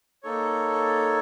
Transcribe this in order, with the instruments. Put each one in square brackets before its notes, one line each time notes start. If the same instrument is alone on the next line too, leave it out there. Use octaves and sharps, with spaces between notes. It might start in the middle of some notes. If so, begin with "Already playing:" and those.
[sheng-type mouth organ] A#3 D#4 A4 C#5